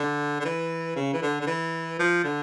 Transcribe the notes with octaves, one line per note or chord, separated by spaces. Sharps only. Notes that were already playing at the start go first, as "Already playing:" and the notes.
Already playing: D3
D3
E3
C#3
E3
D3
D3
E3
F3
D3